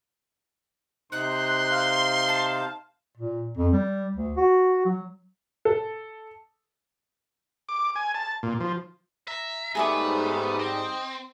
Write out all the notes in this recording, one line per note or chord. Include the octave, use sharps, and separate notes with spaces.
C3 D#4 C5 C6 F#6
F5
A5
A#2
F2
G3
D2
F#4
F#3
A4
D6
G#5
A5
A#2
F3
E5 A#5
G#2 G3 A3 B3 G#4 E5 D6
C4 D#5 G5